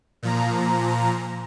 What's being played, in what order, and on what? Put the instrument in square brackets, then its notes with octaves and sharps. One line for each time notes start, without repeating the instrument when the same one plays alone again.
[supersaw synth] A#2 F3 A#5